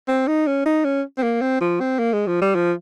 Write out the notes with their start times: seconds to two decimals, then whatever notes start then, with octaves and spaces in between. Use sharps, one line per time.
0.08 C4
0.28 D#4
0.47 C#4
0.66 D#4
0.85 C#4
1.18 C4
1.23 A#3
1.42 C4
1.61 F3
1.80 C4
1.99 A#3
2.13 G#3
2.27 F3
2.42 G3
2.55 F3